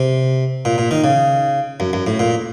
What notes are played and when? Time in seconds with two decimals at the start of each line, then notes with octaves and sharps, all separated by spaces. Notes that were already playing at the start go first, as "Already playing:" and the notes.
Already playing: C3
0.65 A#2
0.78 A#2
0.91 D#3
1.04 C#3
1.80 F#2
1.93 F#2
2.07 A2
2.19 A#2